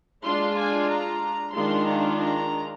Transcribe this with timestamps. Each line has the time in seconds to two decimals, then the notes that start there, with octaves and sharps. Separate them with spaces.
0.24 G#3 D4 F4 C6
0.57 G#5
0.90 A#5
1.54 D#3 G#3 D4 F4 C6
1.88 A#5
2.20 A#5